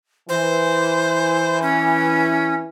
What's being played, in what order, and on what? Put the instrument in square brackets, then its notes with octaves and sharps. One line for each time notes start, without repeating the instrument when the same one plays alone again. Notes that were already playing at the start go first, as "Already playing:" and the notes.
[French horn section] E3 [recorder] C5
[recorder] C#4